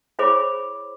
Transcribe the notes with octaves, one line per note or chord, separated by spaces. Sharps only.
E4 G#4 C5 C#5 B5 D6